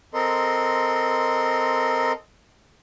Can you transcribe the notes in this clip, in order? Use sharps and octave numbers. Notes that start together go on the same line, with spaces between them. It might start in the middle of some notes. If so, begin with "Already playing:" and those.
C4 A4 A#4 D#5 C6